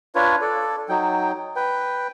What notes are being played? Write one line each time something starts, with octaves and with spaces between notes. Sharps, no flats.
D4 F4 B4 C#5
A4 D5
F#3 D#4 G5
B4 G5